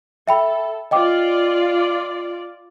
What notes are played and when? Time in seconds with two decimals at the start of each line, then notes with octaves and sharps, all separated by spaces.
0.28 A4 E5 G5 B5
0.91 F4 D5 D#5 G5 D6